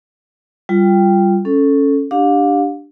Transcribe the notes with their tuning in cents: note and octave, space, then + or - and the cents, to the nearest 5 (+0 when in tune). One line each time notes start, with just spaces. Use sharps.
G3 +0 F4 -10 G5 +0
C#4 +0 A4 +0
D4 +0 G4 +0 F5 +35